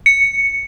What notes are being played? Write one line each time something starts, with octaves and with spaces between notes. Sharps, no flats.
C#7